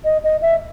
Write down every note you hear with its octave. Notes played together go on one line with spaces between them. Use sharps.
D#5
D#5
E5